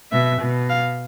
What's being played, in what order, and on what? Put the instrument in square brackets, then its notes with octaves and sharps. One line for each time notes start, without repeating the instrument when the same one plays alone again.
[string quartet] B2 [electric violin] E5
[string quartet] B2
[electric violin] F5